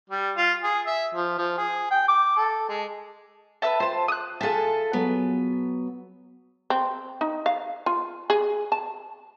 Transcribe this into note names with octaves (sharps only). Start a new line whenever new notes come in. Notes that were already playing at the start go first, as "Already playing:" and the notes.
G3
F4
G#4
E5
F3
F3
G#4
G5
D6
A4
G#3
B4 E5 A5
F4 C5 A5
D#6 F#6
F4 G#4 A4 E5 A5
F#3 B3
C4
D#4
F5
F4
G#4
A5